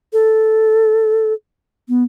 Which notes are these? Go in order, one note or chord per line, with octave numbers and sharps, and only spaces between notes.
A4
B3